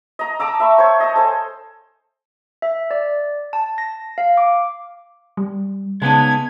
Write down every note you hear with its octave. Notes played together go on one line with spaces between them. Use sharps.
D#5 A#5
A5 A#5 D6 E6
E5 B5 C#6
C5 C#5
D#5 A5
A4 C5 G#5
E5
D5
A5
A#6
F5
D6
G3
C#3 G#3 B3 D#4 C#5 F5 A5 G#6